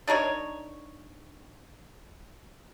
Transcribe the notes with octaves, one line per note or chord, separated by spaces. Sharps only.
D4 D#4 A#4 C#5